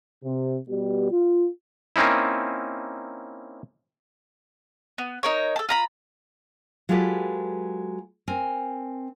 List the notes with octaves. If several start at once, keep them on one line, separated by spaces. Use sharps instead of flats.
C3
B2 G3 B3 G4
F4
A#3 C4 C#4 D#4 E4
B3
D#4 A#4 C#5
A4 A5
F4 A#5 B5
F#3 G#3 F4 G4 A4 B4
C4 A#4 G#5